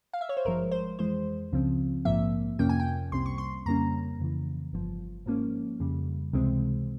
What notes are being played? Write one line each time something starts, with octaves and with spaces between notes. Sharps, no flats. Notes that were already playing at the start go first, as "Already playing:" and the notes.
F5
E5
C#5
C5
G#1 G2 F3 G#3 A#4
C5
F2 E3 G#3 C5
C#2 C#3 F3 C4
A#1 G#2 F3 A#3 E5
F2 C3 F3 A#3 C#4 G5
G#5
G5
C2 C3 G3 C4 C6
C#6
C6
F2 C#3 G3 A#3 C#4 A#5
F2 C#3 E3
G1 G2 F3
G#2 F3 A#3 C#4
F2 C#3 G3
C#2 C3 E3 G#3 C4